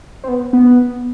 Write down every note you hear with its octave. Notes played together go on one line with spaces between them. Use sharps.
C4
B3
B3